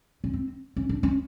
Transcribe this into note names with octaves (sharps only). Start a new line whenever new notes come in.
C#4
C4
C#4
D4
C#4